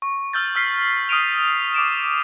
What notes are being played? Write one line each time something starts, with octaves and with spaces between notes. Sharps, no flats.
C#6
E6 F6 G6 A6
E6 F6 B6 C7
D#6 F6 D7 D#7 F7
D6 D7 E7